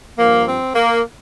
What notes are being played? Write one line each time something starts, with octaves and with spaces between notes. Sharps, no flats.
G2 F3 A#3
C4
A#3